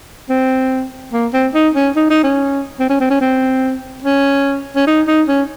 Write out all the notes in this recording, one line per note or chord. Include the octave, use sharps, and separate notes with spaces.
C4
A#3
C4
D#4
C#4
D#4
D#4
C#4
C4
C#4
C4
C#4
C4
C#4
C#4
D#4
D#4
C#4